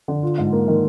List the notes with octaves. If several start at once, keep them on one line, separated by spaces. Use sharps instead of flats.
D3
F4
G#2
A#3
D#3